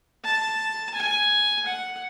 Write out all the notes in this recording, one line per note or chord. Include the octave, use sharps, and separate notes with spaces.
A5
G#5
F#5